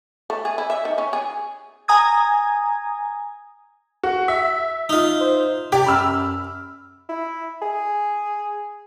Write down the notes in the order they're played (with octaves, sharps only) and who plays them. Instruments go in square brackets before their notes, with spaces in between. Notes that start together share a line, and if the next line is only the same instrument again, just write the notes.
[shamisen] A3
G#4
E4
E5
D#3
C#4
G#4
[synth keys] G#5 A#5 D#6 G#6
[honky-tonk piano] F#4
E5
[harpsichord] D#4 F4
[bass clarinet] C5
[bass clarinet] C3 [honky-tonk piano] G4 [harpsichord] D5
[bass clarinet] F#2 [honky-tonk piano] B5 E6 F6
[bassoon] E4
G#4